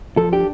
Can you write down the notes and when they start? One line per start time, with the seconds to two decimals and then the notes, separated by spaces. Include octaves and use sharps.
0.17 F3 A4
0.33 D4 G4